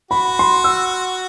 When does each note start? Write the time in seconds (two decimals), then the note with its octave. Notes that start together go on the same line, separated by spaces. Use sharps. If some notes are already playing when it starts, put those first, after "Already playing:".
0.11 F#4 B5
0.39 C6
0.64 E6